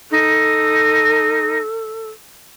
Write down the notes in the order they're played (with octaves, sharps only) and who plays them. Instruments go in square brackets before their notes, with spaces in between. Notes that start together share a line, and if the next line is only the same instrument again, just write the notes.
[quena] D#4 [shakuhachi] A4